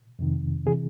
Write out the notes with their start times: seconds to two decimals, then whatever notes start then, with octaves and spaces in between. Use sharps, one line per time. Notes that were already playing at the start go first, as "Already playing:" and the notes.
0.19 F2 C3 D#3
0.66 C3 E3 G#4